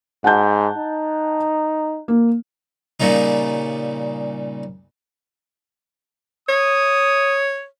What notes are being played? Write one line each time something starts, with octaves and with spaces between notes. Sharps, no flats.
G#2 F#5 A5 G6
D#4
A#3
A#2 C#3 G3 D#4
C#5 D#6